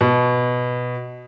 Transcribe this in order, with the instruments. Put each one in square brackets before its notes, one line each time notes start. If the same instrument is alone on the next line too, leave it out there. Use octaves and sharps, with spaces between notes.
[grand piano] B2